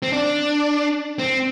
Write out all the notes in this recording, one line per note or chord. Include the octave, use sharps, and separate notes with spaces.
C4
D4
C4